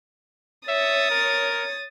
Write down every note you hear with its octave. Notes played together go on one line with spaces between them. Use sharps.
C#5 E5 D#6 A6
A#4